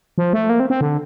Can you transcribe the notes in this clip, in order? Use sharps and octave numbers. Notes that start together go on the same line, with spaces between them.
F3
A3
A#3
C4
C4
D3